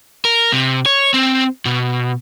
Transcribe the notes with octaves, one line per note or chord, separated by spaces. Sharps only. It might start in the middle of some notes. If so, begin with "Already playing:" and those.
A#4
C3
C#5
C4
B2